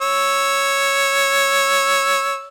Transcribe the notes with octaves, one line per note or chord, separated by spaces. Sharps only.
C#5 E6